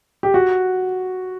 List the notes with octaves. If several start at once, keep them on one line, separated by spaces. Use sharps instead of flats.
G4
F#4